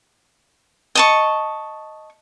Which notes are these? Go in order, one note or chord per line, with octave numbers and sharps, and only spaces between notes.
D#5 A5 C#6